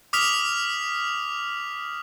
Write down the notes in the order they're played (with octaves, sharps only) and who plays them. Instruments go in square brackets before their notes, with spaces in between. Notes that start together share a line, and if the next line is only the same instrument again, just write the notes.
[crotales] D6 D#6 F6 B6 F7